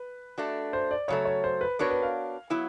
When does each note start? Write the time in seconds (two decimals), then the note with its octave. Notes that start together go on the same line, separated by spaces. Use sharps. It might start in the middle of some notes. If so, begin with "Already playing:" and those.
Already playing: B4
0.38 A3 D4 F#4
0.73 C5
0.91 D5
1.08 C#3 F#3 A3 C#5
1.25 C#5
1.44 C5
1.61 B4
1.79 B3 D4 F#4 A#4 B4 C#5
1.91 B4
2.02 F5
2.50 F#3 B3 E4